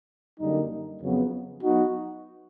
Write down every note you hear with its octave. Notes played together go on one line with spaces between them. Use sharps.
F#2 D3 G3 A#3 D#4
F2 C#3 F#3 B3
F#3 B3 D#4 F#4